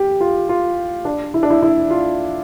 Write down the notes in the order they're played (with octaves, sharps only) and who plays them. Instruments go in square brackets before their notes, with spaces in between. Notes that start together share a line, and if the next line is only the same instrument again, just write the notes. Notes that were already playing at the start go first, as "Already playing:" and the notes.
Already playing: [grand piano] G4
F4
F4
D4
E4
D4
E4
E4
F4